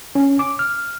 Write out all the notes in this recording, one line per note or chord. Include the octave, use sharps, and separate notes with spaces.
C#4
D6
F6